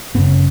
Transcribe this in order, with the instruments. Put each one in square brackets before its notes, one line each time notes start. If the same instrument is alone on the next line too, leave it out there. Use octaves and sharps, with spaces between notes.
[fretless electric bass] G1 F#2 C#3 B3